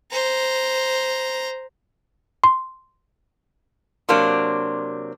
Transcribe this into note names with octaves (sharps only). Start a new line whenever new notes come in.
C5 A#5
C6
C3 F#3 A#3 C4 D4